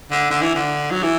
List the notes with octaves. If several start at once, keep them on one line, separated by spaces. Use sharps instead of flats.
D3
D3
E3
D3
F#3
E3